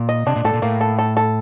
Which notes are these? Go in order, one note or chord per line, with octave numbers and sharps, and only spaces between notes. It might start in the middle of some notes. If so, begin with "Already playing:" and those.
Already playing: A#2
D#5
C3 D4
A#2
A2 A4
A#2
A2 A#3
A4
A4
A4